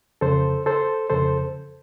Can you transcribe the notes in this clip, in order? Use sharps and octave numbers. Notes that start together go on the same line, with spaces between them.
F2 C#3 A4 C5
A4 C5
F2 C#3 A4 C5